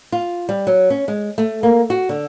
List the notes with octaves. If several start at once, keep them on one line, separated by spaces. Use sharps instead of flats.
F4
G3
F#3
C#4
G#3
A3
A#3
F#4
D3